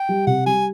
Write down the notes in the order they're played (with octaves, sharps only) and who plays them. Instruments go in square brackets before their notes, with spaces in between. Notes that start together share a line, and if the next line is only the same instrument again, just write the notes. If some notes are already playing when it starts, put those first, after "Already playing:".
Already playing: [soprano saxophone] G5
[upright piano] G3
[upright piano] C3 [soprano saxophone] F#5
[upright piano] G3 [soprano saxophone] G#5